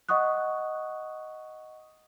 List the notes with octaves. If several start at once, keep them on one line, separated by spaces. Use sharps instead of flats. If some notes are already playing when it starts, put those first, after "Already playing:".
D#5 F#5 C#6 D#6 F#6